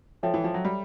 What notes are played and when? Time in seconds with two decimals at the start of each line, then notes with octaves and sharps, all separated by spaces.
0.23 F3 A4 C#5 E5 G5
0.34 E3
0.44 F3
0.54 F#3
0.65 G3